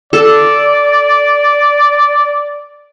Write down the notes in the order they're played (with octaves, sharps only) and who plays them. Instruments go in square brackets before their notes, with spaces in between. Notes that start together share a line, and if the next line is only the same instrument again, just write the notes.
[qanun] A4 [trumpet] D5